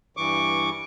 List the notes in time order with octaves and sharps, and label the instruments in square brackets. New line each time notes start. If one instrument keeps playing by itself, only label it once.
[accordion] G2 E3 C#6 D6